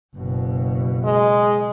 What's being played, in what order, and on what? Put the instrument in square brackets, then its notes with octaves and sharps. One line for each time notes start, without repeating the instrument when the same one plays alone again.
[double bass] F#1 B2
[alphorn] G#3